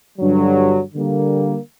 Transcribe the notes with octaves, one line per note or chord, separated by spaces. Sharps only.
G2 D3 F#3
D3 G3 A#3